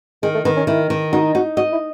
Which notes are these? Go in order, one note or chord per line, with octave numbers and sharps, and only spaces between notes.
D#3 G#3
A3
D#3 B3
C#4
D#3 E4
D#3
D#4 F#4
D#4 F#4
F#4 D#5
E4